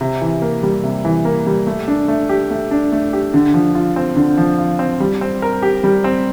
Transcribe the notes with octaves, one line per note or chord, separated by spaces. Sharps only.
C3
E3
A#3
G3
C3
E3
A#3
G3
A3
D4
A3
G4
A3
D4
A3
G4
D3
F3
F4
C4
D3
F3
F4
C4
G3
C4
A#4
G4
G3
C4